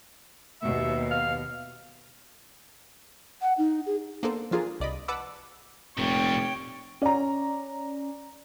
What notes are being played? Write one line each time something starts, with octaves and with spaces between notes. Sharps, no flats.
D#2 B2 E5
F5
F#5
D#4
G#4
A#3 B3 D4 A4 C5
F3 D4 F4 G#4 A#4
C2 D5 D#5 B5
B4 F#5 A5 B5 D6 E6
F1 A#2 G3 C#5 G5
C#4 D5 A#5